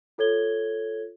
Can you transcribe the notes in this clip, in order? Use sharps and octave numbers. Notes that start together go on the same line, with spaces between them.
F4 A4 C#5 G#6 G7